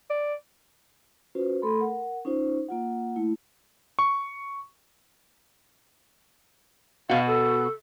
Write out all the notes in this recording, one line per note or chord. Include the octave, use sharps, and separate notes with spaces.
D5
C#4 F4 F#4 B4 C5
A3 A4 B5 C6
A#4 F#5
C#4 D#4 F4 C5
A#3 F4 F#5
A3 E4
C#6
B2 F#4 F5
A4